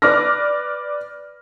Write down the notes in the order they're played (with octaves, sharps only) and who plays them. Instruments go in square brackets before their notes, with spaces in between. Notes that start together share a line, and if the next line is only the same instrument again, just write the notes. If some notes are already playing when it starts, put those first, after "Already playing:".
[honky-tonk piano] B4 D5 D6 F6 A#6